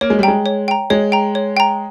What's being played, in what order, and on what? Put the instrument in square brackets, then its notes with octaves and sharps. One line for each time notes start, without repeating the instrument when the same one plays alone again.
[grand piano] A#3 [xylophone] C#5
[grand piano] G#3
G3
[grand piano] G#3 [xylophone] G5 A#5
[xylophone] C#5
G5 A#5
[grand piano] G#3 [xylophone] C#5
[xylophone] G5 A#5
C#5
G5 A#5